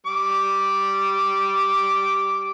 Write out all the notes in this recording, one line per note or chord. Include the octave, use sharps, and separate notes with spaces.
G3 D6